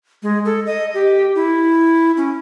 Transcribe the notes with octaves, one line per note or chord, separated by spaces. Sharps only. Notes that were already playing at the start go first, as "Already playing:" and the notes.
G#3
A4
D#5
G4
E4
C#4